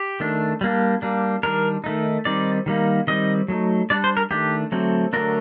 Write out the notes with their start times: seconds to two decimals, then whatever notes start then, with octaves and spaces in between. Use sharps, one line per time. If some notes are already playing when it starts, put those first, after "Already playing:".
Already playing: G4
0.20 D#3 A3 D4
0.61 G3 A#3 D4
1.02 G3 A#3 D4
1.43 D#3 G3 D4 A#4
1.84 D#3 A3 D#4
2.25 D#3 G3 C4 D#4 D5
2.66 D#3 G3 A#3 D#4
3.07 D#3 G3 C4 D#4 D#5
3.48 F#3 A3 D#4
3.90 G3 D4 D5
4.04 C5
4.17 A#4
4.31 D#3 A3 D4 G4
4.72 D3 F#3 A3 C4
5.13 D3 F#3 A3 D4 A#4